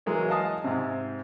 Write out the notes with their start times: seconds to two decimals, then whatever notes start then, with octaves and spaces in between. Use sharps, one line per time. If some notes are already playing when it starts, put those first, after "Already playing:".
0.06 E3 F#3 G#3 A#3
0.29 D#5 F5 G#5 A5 D#6
0.64 G#2 C3